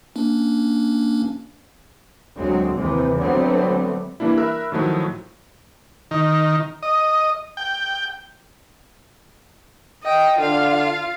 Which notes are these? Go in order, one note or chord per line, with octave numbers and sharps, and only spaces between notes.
A#3 C#4 D4
D2 F#3 G#3 C4
D#2 C3 E3
D3 F#3 G3 A3 B3 C4
E3 G3 A#3 D4 E4
A#4 E5 B5 E6 F#6
A2 D#3 F3 F#3 A3
D#3
D#5
G5
D#5 G5
D3 F4 F5